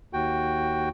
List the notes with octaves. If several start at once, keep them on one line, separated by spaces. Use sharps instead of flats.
D#2 F#4 G5